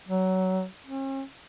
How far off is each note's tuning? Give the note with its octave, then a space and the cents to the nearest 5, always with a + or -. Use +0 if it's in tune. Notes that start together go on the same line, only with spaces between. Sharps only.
F#3 +20
C#4 -45